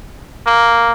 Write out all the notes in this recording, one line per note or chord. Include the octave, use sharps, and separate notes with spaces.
A#3